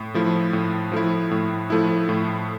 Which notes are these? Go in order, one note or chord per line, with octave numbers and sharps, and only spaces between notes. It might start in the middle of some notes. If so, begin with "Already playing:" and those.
Already playing: A2
F3 A3 E4
A2
F3 A3 E4
A2
F3 A3 E4
A2